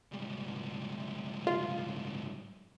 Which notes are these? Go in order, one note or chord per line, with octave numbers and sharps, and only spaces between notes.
C2 G#2
F4